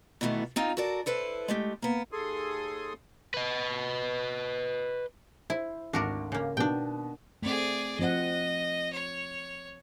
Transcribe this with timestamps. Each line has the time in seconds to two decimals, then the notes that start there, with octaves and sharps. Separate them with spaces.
0.21 B2 D#3 E3 A3 B3
0.56 C4 D#4 F4
0.77 F#4 A4 A#4 D5 A5
1.06 E4 A4 B4 C5
1.48 G#3 A3 G4
1.82 A#3 B3
2.12 D#2 G#4 A4 C6 D#6
3.34 B4 D#5
5.50 E4 C5
5.93 G#1 D2 D4 F#4 A#4 D6
6.32 C#3 A#3
6.57 B2 D#3 B3 D4 G5
7.42 A3 C4 G#4 D5
7.99 F3 C4 D#5 F#5
8.92 C#5